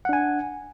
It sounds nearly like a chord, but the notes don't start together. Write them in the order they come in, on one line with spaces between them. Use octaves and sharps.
F#5 D4 G#5